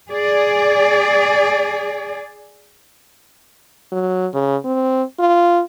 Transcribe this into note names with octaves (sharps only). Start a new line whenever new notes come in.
G#4 D5
F#3
C#3
C4
F4